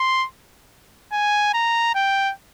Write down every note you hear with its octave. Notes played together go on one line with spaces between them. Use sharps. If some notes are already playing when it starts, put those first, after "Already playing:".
Already playing: C6
G#5
A#5
G5